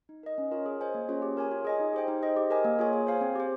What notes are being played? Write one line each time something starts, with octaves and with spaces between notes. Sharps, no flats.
D#4
A#4 D#5
C#4
F4 A#4 C#5
G#4
C5 D#5 G#5
A#3
C#4 F4 G#4 C#5
G4
A#4 C#5 G#5
F4
G#4 D#5 G#5
D#4
G4 C5 G5
D#4
G#4 C5 D#5
G4
A#4 D#5 G#5
A#3
F4 G#4 C#5 G#5
G#4
C5 F5 G#5
C4
G4 C5